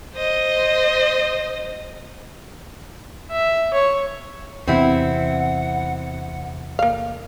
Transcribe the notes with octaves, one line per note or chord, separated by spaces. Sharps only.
C5 D#5
E5
C#5
E2 C3 C4 E4 F#5
A#3 F5